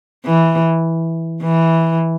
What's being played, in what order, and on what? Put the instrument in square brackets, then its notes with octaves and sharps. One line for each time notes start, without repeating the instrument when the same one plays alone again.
[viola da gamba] E3
E3